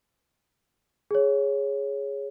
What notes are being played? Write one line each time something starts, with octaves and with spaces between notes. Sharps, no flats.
G#4 C#5